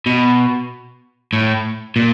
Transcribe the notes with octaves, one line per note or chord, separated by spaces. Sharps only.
B2
A2
A#2